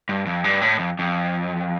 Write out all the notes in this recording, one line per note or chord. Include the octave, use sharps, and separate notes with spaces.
G2
F2
G2
A2
F2
F2